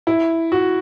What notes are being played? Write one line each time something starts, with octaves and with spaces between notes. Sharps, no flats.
E4
F#4